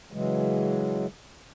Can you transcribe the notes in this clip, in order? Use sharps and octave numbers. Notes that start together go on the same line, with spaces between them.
C#3 E3 F#3 G#3